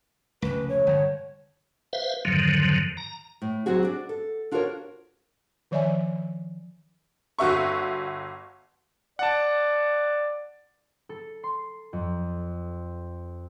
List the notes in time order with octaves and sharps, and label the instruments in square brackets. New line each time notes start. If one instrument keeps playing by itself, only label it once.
[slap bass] F1 C#2 [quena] B4
[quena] C#5
[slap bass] G1
[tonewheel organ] B4 C5 E5 F5
F2 G#2 D3 D#3 F3 F#3
A#5
[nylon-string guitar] A2
F#3 C4 F#4 G#4
D4 D5
A4
D4 F4 F#4 A4 A#4 C#5
[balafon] D#3 F3 C#5 D5 E5 G#5
[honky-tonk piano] G1 F#4 E5 C#6
[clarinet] D5 [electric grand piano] F#5 A5
[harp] A4
C6
F2